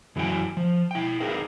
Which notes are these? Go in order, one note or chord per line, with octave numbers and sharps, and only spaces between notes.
F#2 E3 F#3 D4 G5 G#5
F3
E4 G5
D#4 G#4 A#4 B4 F5